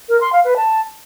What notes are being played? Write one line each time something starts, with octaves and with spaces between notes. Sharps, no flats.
A#4
C6
F5
B4
A5